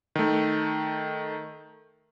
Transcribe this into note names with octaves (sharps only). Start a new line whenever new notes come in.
D#3 A3